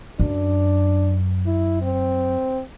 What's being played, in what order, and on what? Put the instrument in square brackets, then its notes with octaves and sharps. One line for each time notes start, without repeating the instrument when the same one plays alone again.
[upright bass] F#2 [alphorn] D4
[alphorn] E4
C4